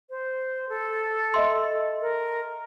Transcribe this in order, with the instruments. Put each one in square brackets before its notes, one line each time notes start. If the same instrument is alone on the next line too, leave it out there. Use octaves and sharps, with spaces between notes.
[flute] C5
A4
[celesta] D#5 E5 C6
[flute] A#4